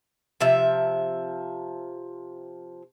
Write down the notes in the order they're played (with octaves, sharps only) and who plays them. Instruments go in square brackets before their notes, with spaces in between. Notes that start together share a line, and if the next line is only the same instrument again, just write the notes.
[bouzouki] C3 F3 E5